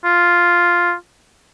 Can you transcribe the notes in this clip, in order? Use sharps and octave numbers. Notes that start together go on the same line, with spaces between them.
F4